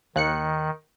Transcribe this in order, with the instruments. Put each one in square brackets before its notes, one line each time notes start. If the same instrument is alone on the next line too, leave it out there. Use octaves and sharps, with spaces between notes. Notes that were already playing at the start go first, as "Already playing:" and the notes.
[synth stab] D#2 F#6 C#7 [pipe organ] D#3